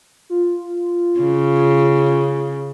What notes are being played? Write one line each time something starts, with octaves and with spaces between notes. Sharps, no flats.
F4
C#3